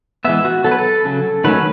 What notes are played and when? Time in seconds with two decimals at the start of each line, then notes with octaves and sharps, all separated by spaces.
0.25 E3 G#3 B3 E5
0.45 F#4
0.64 F#3 B3 A4
0.71 B4
0.79 A4
1.05 C#3 F#3 C#4
1.44 D#3 F#3 A3 C#4 B4